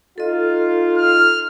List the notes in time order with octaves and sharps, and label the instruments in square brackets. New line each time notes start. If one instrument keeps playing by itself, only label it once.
[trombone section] D#4 F4 [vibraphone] A4 D#5
[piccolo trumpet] F6